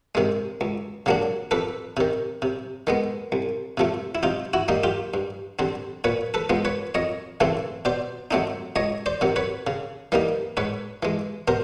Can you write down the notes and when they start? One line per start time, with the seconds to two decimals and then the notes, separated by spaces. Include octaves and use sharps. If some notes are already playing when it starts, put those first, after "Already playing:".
0.15 C3 D#3 G#3
0.61 C#2
1.06 C#3 F#3 A#3 D4
1.51 F2 A4 B4
1.97 C3 D#3
2.42 C3
2.87 D#3 G#3 B3
3.32 C2
3.77 C3 F3 A3
4.15 E4
4.23 C3 D#4 F4
4.54 E4 F#4
4.68 D#3 G3 A#3 D#4
4.84 F4 G4
5.14 G2
5.59 D3 G3 C4
6.04 A#2 B4 C#5
6.34 A4 B4
6.50 F3 G#3 B3
6.65 B4 C#5
6.95 F2 C#5 D#5
7.40 C#3 E3 A3 C4
7.85 B2 C5 D5
8.31 F#3 A3 C4 D#4
8.76 C#2 C#5 D#5
9.06 C5 D5
9.21 C3 D#3 F#3
9.36 B4 C#5
9.67 C#3
10.12 E3 G3 A#3 D#4
10.57 G#2 B4 C#5
11.03 E3 G#3
11.48 B2 A#4 C5